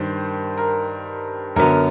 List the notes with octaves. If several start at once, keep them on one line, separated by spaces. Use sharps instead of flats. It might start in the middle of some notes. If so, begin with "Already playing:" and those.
Already playing: G2 D#3 G3 C5
A#4
F#2 D3 F#3 B3 A#4